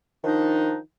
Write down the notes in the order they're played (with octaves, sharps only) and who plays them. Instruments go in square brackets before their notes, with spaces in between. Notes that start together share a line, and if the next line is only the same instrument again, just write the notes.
[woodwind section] D#3 F3 D4 D#4